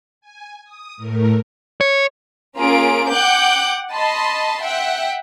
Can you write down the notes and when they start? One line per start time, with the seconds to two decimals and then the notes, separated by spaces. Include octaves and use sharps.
0.21 G#5
0.65 D#6
0.97 A2 A3 A#4
1.81 C#5
2.58 A#3 C#4 F4 G#4 D7
3.11 F#5 G5 D6 F#6 G6
3.94 D#5 A5 B5 C6
4.62 E5 F#5 G5